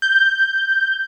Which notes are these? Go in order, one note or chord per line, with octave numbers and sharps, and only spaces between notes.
G6